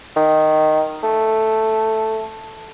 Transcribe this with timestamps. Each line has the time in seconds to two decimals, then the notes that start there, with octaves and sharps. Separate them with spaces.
0.16 D#3
1.03 A3